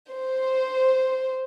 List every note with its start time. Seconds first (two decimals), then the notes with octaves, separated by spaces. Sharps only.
0.12 C5